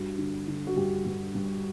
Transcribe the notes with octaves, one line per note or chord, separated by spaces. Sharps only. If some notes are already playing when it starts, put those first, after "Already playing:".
Already playing: G2 F#4
D3
D3
F#4
G2 G4
G2
G2